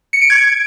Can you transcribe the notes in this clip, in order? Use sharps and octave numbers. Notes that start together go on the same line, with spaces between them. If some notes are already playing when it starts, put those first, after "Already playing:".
C#7
D7
G#6